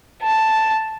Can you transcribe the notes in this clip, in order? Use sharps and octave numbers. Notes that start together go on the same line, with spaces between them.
A5